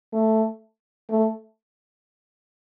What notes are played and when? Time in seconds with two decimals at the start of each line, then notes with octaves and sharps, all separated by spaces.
0.13 A3
1.10 A3